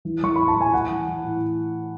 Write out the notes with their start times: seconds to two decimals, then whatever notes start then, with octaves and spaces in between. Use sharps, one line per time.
0.05 E3
0.23 E3 C#6
0.36 A2 B5
0.48 A5
0.56 E3
0.61 G#5
0.73 E3 F#5
0.90 E3
1.07 E3
1.24 A2